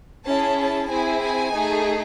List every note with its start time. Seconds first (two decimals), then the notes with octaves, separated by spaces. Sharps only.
0.25 C#4 E4 G#4 A5
0.57 A5
0.89 C4 E4 G#4 G#5
1.22 G#5
1.54 A3 D#4 G#4